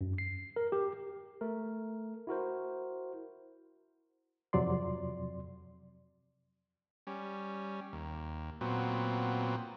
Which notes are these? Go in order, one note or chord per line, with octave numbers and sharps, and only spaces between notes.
F#2
C7
A#4
G4
A3 A#4
E4 F#4 A#4 C5
F2 C3 F#3 D5 C6
G3 C#4
D#2
A#2 F#3 B3 C4